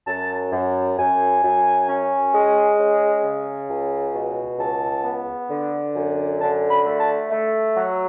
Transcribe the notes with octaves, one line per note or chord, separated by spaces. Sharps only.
F#2 A5
F#2
F#2 G#5
F#2
C#4
G#3
C#4
C#3
C#2
B2
C#2 A5
B3
D3
F#2
D3 A5
B5
A3
A5
A3
F#3